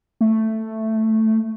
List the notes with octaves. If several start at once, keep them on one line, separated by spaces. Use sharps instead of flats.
A3